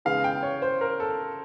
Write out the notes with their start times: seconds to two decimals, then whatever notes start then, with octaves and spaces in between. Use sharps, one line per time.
0.05 C#3 E3 G#3 B3 F5
0.24 G5
0.43 C#5
0.62 C5
0.81 A#4
1.00 A4